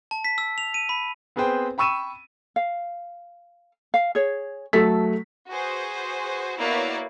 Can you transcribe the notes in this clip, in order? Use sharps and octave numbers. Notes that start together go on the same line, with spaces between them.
A5
B6
E6
F7
D#7
B5
B3 C4 G#4 B4 C5 G5
G5 B5 C#6 E6 D#7 E7
F5
F5
G#4 C#5
F#3 A3 A4 B6
F#4 G#4 B4 C5
A#3 B3 E4 F#4 C#5 D5